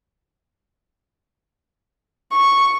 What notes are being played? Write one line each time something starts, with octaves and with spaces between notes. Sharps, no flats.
C#6